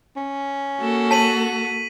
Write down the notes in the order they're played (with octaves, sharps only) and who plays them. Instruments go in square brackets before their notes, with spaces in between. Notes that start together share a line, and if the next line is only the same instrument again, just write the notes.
[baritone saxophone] C#4
[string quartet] A#3 F#4 A4
[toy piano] A5 [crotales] B6 D#7 F#7